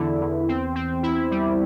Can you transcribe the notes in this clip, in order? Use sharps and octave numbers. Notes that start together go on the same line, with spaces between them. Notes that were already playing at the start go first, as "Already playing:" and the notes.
Already playing: E2 D3 E4
E2
C4
C4
E4
G3